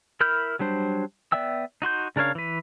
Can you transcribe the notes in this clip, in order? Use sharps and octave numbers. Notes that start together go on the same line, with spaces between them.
E4 A#4 B5 F6 G6
F#3 G3 D4 C5
B3 D5 E5 G5 E6
D#4 F#4 C6 G6
C#3 D4 A#4 C#5 F5
E3 B4